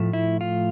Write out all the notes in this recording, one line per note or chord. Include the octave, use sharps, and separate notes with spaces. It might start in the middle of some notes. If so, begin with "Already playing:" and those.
Already playing: A2 F3 A3
E4
F4